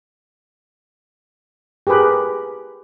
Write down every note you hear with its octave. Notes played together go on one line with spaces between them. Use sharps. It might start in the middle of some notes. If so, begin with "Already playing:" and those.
G4 G#4 A#4 B4